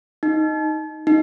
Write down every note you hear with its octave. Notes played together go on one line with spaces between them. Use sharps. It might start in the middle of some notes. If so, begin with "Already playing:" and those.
D#4
D#4